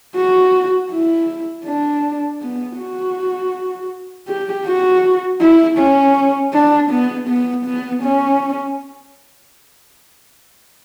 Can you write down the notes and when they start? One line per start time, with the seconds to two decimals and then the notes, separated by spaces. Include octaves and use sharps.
0.16 F#4
0.91 E4
1.65 D4
2.41 B3
2.78 F#4
4.28 G4
4.66 F#4
5.41 E4
5.78 C#4
6.53 D4
6.91 B3
7.28 B3
7.66 B3
8.03 C#4